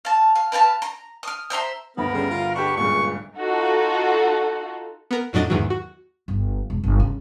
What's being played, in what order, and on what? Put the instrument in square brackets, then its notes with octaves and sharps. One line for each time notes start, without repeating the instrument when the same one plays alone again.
[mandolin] F5 A5
F5
B4 F5 G5 A5
A#5
D#6 F6
C5 E5 A#5 C6
[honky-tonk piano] G1 D2 B5 [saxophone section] B3 [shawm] A#4
[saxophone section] C#3 B3 C#4 [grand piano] G3
[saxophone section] F4
[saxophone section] D4 [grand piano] G4 B4 [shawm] C#6
[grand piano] D1 C#2 G2 [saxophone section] A#2 C#3 G#3 [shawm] C#6
[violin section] D#4 F4 F#4 A4
[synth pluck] B3 A#4
F2 A2 F#3 D4 D#5 A6
E2 G#2 D#3 E3 F#3
F#4
[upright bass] G1
E1
G1
C#3